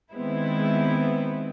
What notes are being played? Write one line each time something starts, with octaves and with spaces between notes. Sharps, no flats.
D#3 G#3 B3 C4 E4